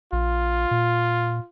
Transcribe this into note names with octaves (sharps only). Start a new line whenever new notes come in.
A#1 F4
A#2